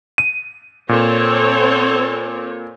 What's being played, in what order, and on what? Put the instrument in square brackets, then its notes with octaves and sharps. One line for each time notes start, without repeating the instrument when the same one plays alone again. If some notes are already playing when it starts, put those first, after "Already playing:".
[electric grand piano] D#7
[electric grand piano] A#2 [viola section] C4 A4 C#5